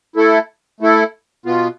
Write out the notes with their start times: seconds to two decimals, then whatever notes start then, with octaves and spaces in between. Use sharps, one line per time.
0.16 A3 E4 A4
0.80 A3 E4 A4
1.46 B2 B3 F4